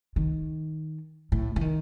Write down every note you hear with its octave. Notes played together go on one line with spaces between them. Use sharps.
D#3
A2
E3
D#3